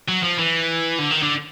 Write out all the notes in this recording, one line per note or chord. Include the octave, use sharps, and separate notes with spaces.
F#3
F3
E3
D3
D#3
D3